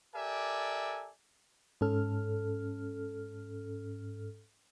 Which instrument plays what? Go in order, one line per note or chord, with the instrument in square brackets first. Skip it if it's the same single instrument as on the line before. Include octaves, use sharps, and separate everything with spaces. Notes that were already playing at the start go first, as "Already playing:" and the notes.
[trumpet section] G4 A4 A#4 D5 E5 G#5
[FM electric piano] G#2 C#4 A4 F6